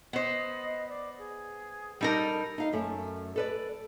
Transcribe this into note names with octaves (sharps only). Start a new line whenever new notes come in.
B3 C5 D#5
D5
G#4
G3 D#4 A4 A#4
D#4 F5
F#2 A3
A4 B4 D5